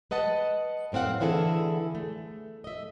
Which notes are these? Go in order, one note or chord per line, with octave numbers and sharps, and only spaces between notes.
B4 D#5 F#5 A5
F#2 A2 C4 F5 F#5
D3 E3 E4 G#4 A4
A3
D#5 E5